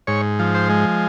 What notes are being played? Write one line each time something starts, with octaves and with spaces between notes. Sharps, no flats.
G#2 C#5
F3
C5
G#3